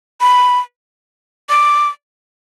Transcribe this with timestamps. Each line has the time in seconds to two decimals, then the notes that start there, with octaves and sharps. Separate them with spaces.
0.21 B5
1.50 D6